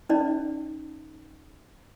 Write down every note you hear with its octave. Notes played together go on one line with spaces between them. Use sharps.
C#4 D#4 D5